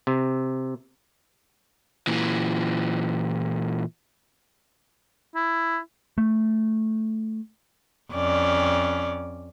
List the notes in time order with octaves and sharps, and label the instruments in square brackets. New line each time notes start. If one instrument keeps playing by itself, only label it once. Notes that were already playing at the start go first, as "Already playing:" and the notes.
[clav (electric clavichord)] C3
[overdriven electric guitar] A#2 E3
[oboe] E4
[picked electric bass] A3
[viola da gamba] F2 C#4 D5